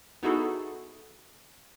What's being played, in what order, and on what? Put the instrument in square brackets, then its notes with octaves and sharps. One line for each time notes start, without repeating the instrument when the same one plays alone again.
[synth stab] B3 D#4 E4 F#4 G#4 A4